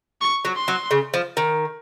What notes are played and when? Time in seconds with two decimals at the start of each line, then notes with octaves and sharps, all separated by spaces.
0.21 C#6
0.45 F#3
0.56 C6
0.68 F#3
0.91 C#3
1.14 F3
1.37 D#3